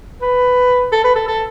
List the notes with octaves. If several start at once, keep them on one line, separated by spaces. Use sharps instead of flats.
B4
A4
B4
A4
A4